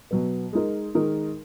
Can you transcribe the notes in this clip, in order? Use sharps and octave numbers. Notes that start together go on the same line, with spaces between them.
B2 F#3 B3
G#3 D#4 A#4
D#3 G#3 D#4 A#4